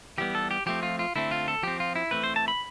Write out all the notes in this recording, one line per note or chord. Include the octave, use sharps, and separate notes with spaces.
E3 G3 B3 G4
A4
G4
F3 A3 C4 G4
F4
F4
D3 A3 C4 E4
F4
A4
F3 C4 G4
F4
E4
E3 A3 C4 B4
C5
A5
B5